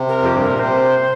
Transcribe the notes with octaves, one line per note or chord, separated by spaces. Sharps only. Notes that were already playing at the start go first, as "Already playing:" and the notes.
Already playing: C3
A#4
F2 G4
G2
A#2 A#4
C3 C5